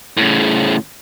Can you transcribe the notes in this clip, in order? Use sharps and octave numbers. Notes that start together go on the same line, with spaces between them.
A2 C#3